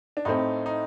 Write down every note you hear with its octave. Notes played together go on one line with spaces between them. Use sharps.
D4
A2 A3 C4 D#4
D#4